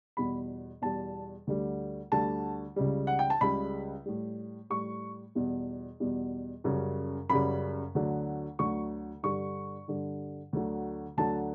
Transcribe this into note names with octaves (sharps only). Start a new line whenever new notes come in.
E2 B2 G3 B5
E2 B2 G3 A5
D2 D3 G3
D2 D3 G3 A5
C#2 C#3 G3
F#5
G5
A5
C#2 C#3 G3 B5
A2 G3
A2 G3 C#6
E2 B2 G3
E2 B2 G3
F#2 C#3 G3
F#2 C#3 G3 B5
D2 D3 F#3
D2 D3 F#3 C#6
G2 D3 G3 C#6
G2 D3 G3
D2 D3 F#3
D2 D3 F#3 A5